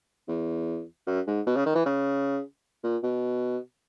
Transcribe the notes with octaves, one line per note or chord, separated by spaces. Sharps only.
E2
F#2
G#2
B2
C#3
D#3
E3
C#3
A#2
B2